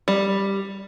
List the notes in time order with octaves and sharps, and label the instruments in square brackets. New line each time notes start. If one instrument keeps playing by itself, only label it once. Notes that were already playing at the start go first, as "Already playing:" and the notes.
[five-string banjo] G3